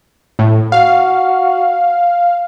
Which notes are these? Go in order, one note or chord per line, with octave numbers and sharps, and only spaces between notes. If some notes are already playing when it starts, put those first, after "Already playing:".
A2
F#4 F5